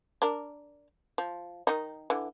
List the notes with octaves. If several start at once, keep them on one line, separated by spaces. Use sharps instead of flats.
D4 A#4
F3
D#3 D#4
D3 E3